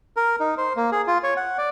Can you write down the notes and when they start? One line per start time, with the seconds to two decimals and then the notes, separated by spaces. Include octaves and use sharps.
0.17 A#4
0.40 D#4
0.58 C5
0.76 A#3
0.92 G#4
1.07 F4
1.23 C#5
1.37 F#5
1.58 D5